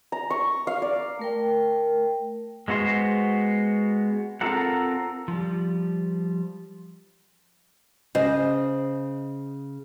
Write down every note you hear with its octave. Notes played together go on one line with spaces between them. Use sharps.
A#5
C#6
F5
D5
A3 A#4 G5
G#3 B3 F#4 C5 C6
C4 F4 A4 A#4 F#5
F3 G3
C#3 C5 D#5